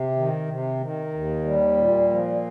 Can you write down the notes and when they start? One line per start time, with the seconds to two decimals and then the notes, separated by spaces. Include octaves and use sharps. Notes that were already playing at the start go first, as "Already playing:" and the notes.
Already playing: C3
0.16 D#3
0.49 C3
0.81 D#3
1.13 D#2
1.45 G3
1.77 A#2
2.10 F3